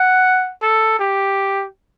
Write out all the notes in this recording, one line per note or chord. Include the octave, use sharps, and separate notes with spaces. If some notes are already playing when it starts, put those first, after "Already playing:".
Already playing: F#5
A4
G4